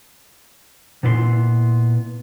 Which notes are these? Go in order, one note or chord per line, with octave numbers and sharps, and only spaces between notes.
A#2 B3 E4 A#4 C6